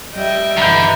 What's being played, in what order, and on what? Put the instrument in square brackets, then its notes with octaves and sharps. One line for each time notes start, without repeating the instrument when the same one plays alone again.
[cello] G3 G5 [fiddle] D#5 E5
[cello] G2 E3 [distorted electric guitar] D3 [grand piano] A#5 B5 G6